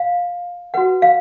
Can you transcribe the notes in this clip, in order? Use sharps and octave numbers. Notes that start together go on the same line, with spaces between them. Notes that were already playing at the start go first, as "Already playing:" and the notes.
Already playing: F5
F#4 B4 F#5
F5